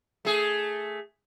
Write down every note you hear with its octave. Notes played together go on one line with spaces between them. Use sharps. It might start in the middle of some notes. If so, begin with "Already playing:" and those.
A3 G#4